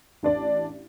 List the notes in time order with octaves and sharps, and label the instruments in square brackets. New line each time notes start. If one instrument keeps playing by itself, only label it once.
[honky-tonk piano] A1 D4 D5